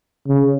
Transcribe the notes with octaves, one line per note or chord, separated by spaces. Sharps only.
C#3